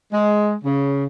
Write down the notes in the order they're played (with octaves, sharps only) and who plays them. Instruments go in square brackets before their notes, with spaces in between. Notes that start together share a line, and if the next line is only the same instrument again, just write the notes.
[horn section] G#3
C#3